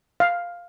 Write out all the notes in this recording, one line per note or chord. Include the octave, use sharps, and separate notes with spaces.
F5